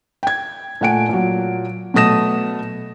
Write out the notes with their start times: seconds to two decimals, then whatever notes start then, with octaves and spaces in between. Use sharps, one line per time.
0.23 G5 G#6
0.81 A#2 A3 F#5 G#5 D7
1.09 A#2 F#3
1.94 B2 F#3 A3 D#6 A#6 E7